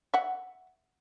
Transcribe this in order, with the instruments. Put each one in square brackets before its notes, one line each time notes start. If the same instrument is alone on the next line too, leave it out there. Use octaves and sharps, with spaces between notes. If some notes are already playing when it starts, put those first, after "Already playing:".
[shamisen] E5 F#5